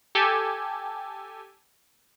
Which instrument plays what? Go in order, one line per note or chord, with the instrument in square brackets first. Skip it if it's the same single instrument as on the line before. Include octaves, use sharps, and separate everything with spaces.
[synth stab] G4 A4 G#5